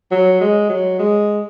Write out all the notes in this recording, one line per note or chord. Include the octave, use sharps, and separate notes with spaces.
F#3
G#3
F#3
G#3